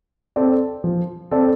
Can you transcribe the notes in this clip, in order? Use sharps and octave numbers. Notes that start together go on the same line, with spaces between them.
C4 A4 D5
F3
C4 A4 D5